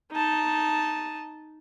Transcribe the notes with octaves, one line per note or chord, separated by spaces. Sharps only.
D#4 A5